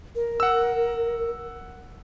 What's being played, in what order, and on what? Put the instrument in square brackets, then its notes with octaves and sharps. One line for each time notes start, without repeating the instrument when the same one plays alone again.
[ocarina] A#4
[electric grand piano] F#5 E6